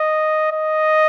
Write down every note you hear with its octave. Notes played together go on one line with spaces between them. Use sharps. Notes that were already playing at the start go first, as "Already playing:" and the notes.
Already playing: D#5
D#5